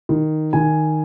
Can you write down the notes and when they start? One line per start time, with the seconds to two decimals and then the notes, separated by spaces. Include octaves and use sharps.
0.09 D#3
0.53 D#3 G#5